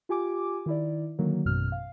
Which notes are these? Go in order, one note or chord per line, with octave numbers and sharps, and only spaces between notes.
F4 G4 G#5 D6
D#3 E4 D5
D3 D#3 F#3 A#3
A1 F#2 B2 F6
F5